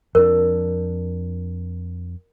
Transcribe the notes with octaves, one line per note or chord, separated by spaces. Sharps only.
F2 D4 A#4